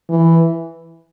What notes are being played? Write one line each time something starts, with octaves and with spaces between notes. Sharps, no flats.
E3